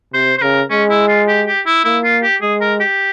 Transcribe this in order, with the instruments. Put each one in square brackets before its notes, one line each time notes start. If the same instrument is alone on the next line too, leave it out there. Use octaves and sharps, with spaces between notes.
[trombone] C3 [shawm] C5
[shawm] C5
[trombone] C#3 [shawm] A#4
[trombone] G#3 [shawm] C#4
[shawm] E4
F4
G4
G4
E4
[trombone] A#3 [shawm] E4
[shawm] F4
G4
[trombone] G#3 [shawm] G#4
[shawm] A#4
G4